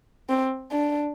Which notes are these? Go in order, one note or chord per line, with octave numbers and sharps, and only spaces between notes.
C4
D4